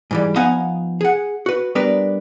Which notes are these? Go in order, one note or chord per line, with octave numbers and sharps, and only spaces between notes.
G#2 E3 G3
F3 B3 D#4 F5 F#5 G#5
G#4 F#5
F#4 B4
G3 B3 D4 A#4 B4 D5